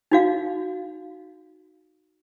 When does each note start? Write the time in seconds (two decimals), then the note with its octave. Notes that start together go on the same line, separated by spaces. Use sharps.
0.12 D#4 F#4 F5